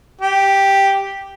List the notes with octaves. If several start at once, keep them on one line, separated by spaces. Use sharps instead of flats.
G4